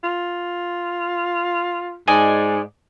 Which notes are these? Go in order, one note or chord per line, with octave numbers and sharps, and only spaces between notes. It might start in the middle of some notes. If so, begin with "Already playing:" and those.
F4
G#2 D5 D#5 G#5